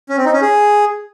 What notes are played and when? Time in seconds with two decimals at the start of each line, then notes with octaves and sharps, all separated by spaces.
0.09 C#4
0.17 C4
0.25 D#4
0.33 C#4
0.41 G#4